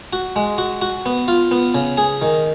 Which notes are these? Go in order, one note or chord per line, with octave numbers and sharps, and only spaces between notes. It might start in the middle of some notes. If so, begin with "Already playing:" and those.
F#4
G#3
F#4
F#4
B3
F4
B3
C#3
G#4
D#3